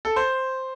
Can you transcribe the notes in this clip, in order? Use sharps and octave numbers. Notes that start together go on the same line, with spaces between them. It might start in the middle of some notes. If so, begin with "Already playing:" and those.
A4
C5